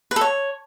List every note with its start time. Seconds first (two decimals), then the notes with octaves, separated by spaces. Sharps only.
0.11 B4
0.16 A4
0.21 C#5